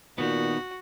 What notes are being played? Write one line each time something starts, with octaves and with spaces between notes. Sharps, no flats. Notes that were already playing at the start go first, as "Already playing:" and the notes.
A#2 D#3 B3 F#4